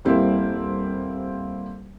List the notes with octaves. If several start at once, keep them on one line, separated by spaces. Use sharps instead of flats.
D#1 G3 A#3 C4 E4